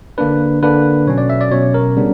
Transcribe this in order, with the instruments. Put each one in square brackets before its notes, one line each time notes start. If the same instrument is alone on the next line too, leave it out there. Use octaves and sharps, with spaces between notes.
[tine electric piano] D3 A#3 D4 B4
D3 A#3 D4 B4
B2 F#3 C#4 C#5
D5
E5
D5
B2 F#3 C#4 C#5
A#4
C#3 G3 B3 D4